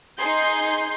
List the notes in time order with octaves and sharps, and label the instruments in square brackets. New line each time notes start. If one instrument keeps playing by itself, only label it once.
[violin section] D#4 G#4 C6 G6